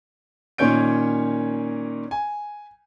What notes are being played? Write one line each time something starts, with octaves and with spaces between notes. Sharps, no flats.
A#2 D#3 C#4 C#5 G6 D7
G#5